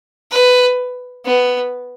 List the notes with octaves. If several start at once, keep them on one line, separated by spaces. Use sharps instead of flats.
B4
B3